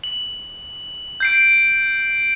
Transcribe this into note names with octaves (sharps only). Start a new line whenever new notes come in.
F#7
G6 C7 D7